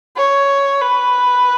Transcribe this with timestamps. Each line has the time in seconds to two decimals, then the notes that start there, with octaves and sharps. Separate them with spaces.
0.17 C#5
0.81 B4